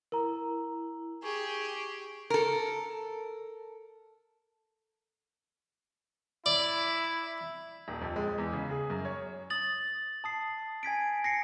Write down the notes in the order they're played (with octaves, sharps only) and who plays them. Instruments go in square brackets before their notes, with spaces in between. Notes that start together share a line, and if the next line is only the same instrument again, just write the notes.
[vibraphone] E4 [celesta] A#4 A#5
[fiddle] G4 G#4 [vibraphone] C#6
[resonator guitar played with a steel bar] A4 A#4
[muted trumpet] E4 [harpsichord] D5
[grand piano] D#1
F2
G#3
E2
C#3
G#4
F#2
C#5
[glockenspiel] D#6 A6 F#7
A5 D#6 C7
G#5 G#6 B6 D7
A#6 C7 C#7